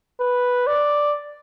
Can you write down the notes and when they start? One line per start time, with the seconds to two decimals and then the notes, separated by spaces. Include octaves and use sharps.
0.20 B4
0.67 D5